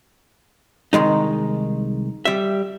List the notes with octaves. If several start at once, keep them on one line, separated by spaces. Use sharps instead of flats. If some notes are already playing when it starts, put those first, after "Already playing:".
C2 D#3 G#3 D#4
G3 E5